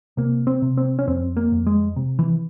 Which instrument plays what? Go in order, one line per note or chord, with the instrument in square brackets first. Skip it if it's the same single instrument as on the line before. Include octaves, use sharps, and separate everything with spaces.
[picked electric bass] C3 A#3
C4
C3
C4
C#4
F2 C4
A#3
F2
G#3
C3
E3